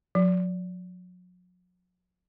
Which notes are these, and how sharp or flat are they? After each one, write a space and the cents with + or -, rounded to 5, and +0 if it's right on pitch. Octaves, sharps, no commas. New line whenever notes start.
F#3 -40